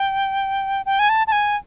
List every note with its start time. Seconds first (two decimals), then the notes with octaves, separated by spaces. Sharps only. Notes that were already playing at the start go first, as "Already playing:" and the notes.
Already playing: G5
0.86 G5
0.99 G#5
1.09 A5
1.27 A5
1.32 G#5